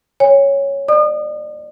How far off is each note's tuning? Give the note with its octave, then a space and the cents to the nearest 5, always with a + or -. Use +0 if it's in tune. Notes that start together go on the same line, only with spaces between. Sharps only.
C#5 +0 G#5 -40
D5 +40 D#6 -35